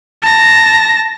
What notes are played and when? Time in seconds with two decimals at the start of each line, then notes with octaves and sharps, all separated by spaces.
0.22 A5 A#6